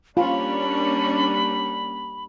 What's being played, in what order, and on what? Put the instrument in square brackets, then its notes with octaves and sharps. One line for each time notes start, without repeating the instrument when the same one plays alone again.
[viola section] G3 A#3 D4 [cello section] C#4 [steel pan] F4 [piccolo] B5